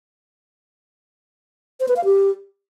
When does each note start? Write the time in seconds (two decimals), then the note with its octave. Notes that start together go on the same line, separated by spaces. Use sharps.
1.80 C5
1.88 B4
1.96 F5
2.05 G4